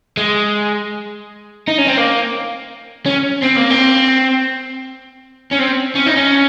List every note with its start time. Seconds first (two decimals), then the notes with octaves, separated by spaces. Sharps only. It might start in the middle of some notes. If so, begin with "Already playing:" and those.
0.17 G#3
1.68 D#4
1.78 C#4
1.88 C4
1.98 A#3
3.06 C#4
3.42 C4
3.56 A#3
3.70 C4
5.51 C#4
5.59 C4
5.95 C#4
6.06 D#4
6.16 C#4